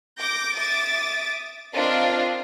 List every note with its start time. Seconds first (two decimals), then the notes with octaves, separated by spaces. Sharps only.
0.18 D6 G6 A#6
0.56 E5 D6 D#6 A6
1.74 C4 D4 F4 A#4 D#5 F5